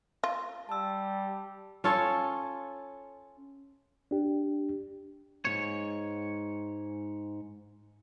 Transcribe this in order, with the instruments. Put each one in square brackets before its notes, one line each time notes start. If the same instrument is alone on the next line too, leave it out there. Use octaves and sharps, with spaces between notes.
[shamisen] F4
[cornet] G3 [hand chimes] A5 E6
[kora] C#4 F4 A4 C#5
[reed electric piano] D4 G4
[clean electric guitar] G#2 C3 C#5